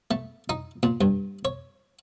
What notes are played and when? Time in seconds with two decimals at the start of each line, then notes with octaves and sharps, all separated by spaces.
0.11 A3
0.49 D#4
0.83 A#2
1.01 G2
1.45 C#5